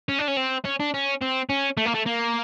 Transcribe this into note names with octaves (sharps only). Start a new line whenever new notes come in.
C#4
D4
C#4
C4
C#4
D4
C#4
C4
C#4
A3
A#3
A3
A#3